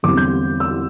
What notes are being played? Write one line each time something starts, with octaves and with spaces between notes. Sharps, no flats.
E2 D3 G3 C4 D6
G6
E6